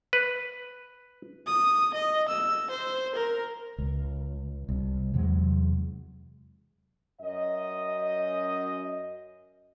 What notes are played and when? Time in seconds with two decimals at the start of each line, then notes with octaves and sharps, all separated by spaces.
0.13 B4
1.47 D#6
1.94 D#5
2.29 E6
2.71 C5
3.15 A#4
3.78 C#2
4.69 C2
5.14 E2 C3 F#3 G#3
7.20 F#2 D#5